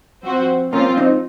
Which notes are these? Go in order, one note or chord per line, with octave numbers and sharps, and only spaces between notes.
F3 C4 F#4 C5
F3 A#3 C4 C#4 F4
C4 D#4